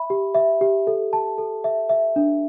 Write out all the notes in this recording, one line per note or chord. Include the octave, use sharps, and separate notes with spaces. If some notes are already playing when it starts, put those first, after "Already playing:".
Already playing: E5 B5
G4
E5
G4
A4
A5
A4
E5
E5
D4